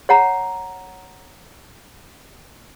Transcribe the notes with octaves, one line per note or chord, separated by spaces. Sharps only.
C#5 F#5 A#5